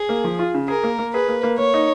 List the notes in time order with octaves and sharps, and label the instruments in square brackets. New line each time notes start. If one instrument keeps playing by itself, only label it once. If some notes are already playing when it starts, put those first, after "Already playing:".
Already playing: [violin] G#4
[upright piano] A#3
F3
F4
C#3
[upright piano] G#4 [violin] A#4
[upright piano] A#3
A#3
[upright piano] G#4 [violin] B4
[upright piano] A#3
A#3
[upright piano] A#3 [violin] C#5
[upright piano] D#4